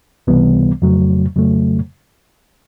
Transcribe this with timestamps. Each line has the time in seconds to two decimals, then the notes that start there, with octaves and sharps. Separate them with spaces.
0.27 C#2 C3 E3 G3 B3
0.82 F2 C#3 F#3 A3
1.36 F2 C#3 F#3 A3